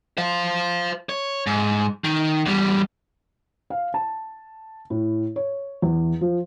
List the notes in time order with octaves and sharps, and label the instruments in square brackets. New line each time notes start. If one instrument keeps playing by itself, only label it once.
[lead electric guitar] C5 F5
C#5
G#2
D#3
E2 G3
[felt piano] F5
A5
A2
C#5
E2
F3